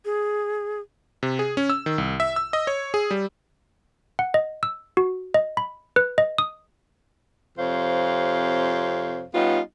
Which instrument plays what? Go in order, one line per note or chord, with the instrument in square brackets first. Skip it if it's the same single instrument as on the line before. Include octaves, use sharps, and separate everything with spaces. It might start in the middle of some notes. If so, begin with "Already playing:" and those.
[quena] G#4
[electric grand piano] C3
G#4
C#4
E6
D#3
C2
E5
E6
D#5
C#5
G#4
G3
[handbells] F#5
D#5
E6
F#4
D#5
B5
B4
D#5
D#6
[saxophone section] F2 C3 C5 C#5 F5
G3 B3 C#4 D#4 F4